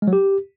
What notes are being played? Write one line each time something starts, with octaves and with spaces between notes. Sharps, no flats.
G#3
F#3
G4